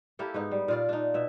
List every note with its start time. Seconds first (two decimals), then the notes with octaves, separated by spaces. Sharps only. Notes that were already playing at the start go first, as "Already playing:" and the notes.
0.19 A#3 E4 G4 A4
0.34 G#2 B3 D#4
0.51 G3
0.68 A#2 F4 D5
0.89 D4 D#4
1.14 B2 E5